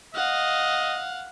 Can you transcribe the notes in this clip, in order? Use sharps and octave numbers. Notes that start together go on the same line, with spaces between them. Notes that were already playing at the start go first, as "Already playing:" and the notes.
D#5 F5 F#5